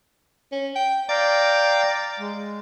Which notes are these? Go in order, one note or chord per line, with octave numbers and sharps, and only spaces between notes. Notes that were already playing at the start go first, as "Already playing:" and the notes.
C#4
G5
D5 F5 G5 A#5
G#3